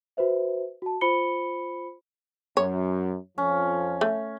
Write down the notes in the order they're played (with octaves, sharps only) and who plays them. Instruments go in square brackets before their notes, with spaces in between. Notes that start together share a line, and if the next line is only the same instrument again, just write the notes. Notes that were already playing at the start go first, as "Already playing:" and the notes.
[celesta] F#4 B4 C5 E5
F#4 A5
F4 C5 B5 C#7 G7
[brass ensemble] F#2 [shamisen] C#5
[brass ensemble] F2 F3 [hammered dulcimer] C#4
[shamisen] A3